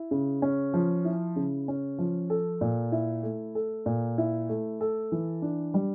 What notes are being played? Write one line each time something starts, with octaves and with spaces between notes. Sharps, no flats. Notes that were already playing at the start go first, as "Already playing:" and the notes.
Already playing: E4
C#3
C#4
F3
E4
C#3
C#4
F3
A4
A#2
E4
A3
A4
A#2
E4
A3
A4
E3
D4
G3